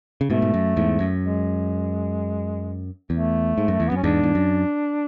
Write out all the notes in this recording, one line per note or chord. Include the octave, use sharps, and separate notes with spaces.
C#3
G#2 B2 A3
G#2
F#2
E2 G#2
F#2
G#3
E2 A3
G#2
F#2
E2
B3
F#2
C#4
E2 G#2 D4
E2
F#2